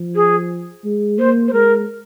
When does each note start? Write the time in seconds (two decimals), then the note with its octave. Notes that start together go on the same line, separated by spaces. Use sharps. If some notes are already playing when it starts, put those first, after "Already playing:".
Already playing: F3
0.15 G#4
0.84 G#3
1.18 A#3 C5
1.48 C5
1.53 G#3 A#4